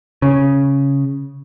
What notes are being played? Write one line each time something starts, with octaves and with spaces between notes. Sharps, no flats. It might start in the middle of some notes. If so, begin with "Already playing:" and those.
C#3